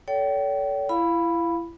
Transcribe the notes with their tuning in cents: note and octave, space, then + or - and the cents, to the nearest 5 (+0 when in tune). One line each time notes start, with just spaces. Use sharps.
A4 +0 C#5 +45 G5 -30
E4 +30 F5 +0 B5 +0